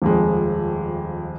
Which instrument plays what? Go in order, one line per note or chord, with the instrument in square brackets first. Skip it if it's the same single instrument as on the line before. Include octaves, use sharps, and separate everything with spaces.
[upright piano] D#1 F2 G#3